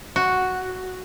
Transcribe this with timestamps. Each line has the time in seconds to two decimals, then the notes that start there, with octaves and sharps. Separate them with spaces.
0.16 F#4